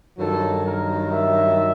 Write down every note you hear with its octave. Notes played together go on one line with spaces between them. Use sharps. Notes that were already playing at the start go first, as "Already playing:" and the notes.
G2 D#3 F#3 A4
A#4
E5